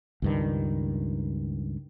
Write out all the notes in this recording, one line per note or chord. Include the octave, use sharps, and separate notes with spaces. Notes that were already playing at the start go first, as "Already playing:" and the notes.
C#2 G2 D#3